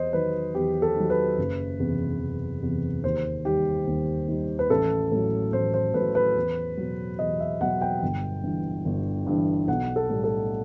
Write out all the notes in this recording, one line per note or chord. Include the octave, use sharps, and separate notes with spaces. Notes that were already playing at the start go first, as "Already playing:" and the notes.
Already playing: E2 C5 D#5
D#3 F#3 B4
E2 G4
A4
D#3 F#3
B4
F#1
E2 C3
F#1
E2 C3
D#2 C5
D#3 G3 G4
D#2
D#3 G3
B4
A1 A4
A2 F#3
A1 C5
C5
A2 F#3 B4
B4
E2
B2 F#3
E2 D#5
E5
B2 F#3 F#5
G5
G1
G2 E3
G1
G2 E3
B1 F#5
A4
A2 G3
A4